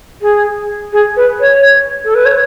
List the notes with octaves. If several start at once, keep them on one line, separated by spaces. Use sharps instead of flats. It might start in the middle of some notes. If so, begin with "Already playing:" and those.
G#4
G#4
B4
C#5
A4
B4
C#5